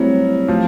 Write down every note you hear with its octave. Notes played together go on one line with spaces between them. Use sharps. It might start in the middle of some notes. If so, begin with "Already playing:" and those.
Already playing: F#3 G3 A3 C4 E4
F3 A3 C4